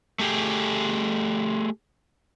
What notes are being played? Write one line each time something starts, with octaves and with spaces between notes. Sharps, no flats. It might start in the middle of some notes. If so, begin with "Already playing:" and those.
A3 G4 G#4